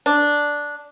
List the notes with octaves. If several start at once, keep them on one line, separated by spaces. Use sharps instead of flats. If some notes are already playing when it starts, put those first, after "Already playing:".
D4